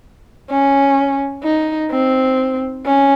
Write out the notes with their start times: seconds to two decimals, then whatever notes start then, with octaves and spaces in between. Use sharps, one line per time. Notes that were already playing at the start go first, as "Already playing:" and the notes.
0.50 C#4
1.44 D#4
1.91 C4
2.86 C#4